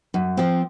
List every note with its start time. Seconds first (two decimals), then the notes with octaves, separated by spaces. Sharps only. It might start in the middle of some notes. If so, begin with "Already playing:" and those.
0.14 F#2
0.37 F3 C4